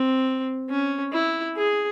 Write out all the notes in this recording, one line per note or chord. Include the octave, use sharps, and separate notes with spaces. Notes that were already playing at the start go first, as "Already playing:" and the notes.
Already playing: C4
C#4
E4
G#4